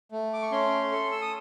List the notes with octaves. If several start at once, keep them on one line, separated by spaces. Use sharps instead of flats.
A3
D6
C#6
C#4 C6
A4
E6
D#6